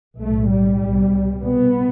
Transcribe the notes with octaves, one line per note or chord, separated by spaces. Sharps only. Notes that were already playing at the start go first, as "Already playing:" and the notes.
B1 A2 A3
G3
C2 B2
C2 B2 B3